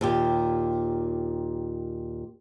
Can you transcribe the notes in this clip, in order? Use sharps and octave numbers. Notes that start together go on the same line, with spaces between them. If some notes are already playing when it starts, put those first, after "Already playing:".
D#2 A#2 G4